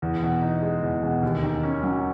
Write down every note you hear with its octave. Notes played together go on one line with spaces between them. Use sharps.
E2
B2
D#4
G#3
E2
B2
D#2
D#3
C#4
F#3